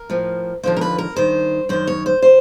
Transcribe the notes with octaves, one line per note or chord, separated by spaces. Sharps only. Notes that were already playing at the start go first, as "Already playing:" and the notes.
Already playing: A#4
A2 F3
D#2 D3 F3 C5
A#4
B4
A#4
G2 D#3 C5
F#2 D#3 C5
C#5
C5
E3 C5